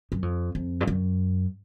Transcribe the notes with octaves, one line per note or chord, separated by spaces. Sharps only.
F#2
F2
F2
G2
F#2